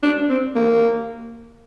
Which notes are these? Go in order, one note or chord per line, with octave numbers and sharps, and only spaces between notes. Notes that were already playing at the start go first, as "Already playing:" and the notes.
D4
C4
A#3